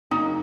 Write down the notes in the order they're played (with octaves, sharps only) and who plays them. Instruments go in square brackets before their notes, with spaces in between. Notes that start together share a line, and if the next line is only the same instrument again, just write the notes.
[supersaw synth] F#2 C#3 F#3 A#3 [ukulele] D#4